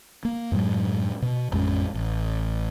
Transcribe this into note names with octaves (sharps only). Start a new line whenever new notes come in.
A#3
F#2 A2 F#3 G#3
B2
A1 F2 G#3 C#4
A1